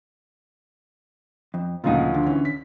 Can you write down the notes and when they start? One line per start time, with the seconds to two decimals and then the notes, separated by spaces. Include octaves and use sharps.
1.54 F2
1.84 D2 A#2 C#3 F3 D#4 F4
2.14 D3
2.26 E3 C#4
2.45 B6